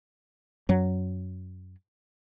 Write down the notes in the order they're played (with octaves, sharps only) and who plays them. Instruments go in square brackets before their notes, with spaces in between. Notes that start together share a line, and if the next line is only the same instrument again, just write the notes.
[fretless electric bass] F#2 F#3